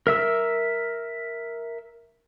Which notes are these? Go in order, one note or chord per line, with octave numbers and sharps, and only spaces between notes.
A#4 E5 E6